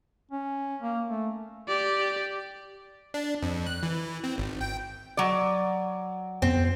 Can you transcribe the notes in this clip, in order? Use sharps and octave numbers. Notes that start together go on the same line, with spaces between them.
C#4
A#3
A3
G4 D5
D4
F2
F#6
E3
C4
G#1
G5
F#3 D5
F2 B3 C4